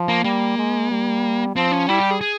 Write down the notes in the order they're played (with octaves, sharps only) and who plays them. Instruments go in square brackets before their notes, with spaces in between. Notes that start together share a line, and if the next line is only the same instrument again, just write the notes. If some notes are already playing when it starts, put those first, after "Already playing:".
Already playing: [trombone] F3
[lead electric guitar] A#3
[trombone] G3 [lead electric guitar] A#3
[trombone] G#3
G3
[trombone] F3 [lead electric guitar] C4
[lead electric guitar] C#4
[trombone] G3 [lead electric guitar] E4
[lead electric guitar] G4
G#4
G#4